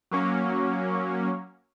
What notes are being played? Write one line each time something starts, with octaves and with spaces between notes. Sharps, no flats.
F#3 A#3 C#4